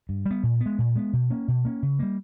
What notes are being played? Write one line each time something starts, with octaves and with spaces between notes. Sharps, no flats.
G2
G3 B3
A#2
B3
G#3
A#2
G#3 B3
B2
A#3 C#4
B2
A#3 C#4
C#3
G3 A#3